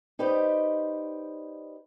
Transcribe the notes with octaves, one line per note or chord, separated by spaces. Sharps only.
D#4 G4 B4 C5 D5 D#5